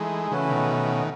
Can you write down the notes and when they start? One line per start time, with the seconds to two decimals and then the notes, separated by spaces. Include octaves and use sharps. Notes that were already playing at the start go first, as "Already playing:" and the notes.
Already playing: E3 G#3 A3 D#4 G#4
0.31 C#3 E3 A3 C#4 F#4 B4
0.50 B2 D#3